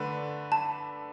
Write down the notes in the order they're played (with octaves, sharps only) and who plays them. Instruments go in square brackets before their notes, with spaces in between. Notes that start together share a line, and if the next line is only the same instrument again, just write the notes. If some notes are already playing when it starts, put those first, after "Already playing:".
Already playing: [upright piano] D3 A3 D4 B4
[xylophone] A5